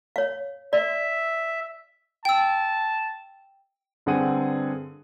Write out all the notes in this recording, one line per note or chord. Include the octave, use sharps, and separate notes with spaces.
C#5 F5
D5 E5
G5 A5 E6
G2 D3 C4 G#4 F#5 D#7